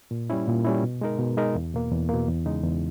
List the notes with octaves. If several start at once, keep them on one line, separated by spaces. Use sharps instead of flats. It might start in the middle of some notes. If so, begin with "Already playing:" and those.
A#2
G3 C#4 E4
A#2
G3 C#4 E4
B2
G#3 D#4 A#4
B2
G#3 D#4 A#4
E2
B2 A#3
E2
B2 A#3
E2
C#3 G#3 D#4
E2